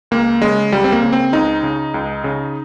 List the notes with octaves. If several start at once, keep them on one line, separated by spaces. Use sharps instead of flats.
C#2 A#3
C#3 G#3
C#2 G3
C4
A#3
C#3
C4
C#2 D#4
C#3
C#2
C#3